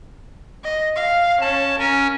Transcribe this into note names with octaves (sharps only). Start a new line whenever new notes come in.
D#5
F5
C#4 A5
C#4 A#4